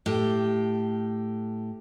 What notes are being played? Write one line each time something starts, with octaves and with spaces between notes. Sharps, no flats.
A2 G4